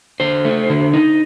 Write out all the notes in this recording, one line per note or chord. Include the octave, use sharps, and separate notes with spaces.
D3 C5
A3
D3
D#4